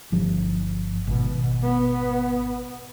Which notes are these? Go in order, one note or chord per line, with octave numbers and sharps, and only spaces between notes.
G1 F3
G#1 B2
B3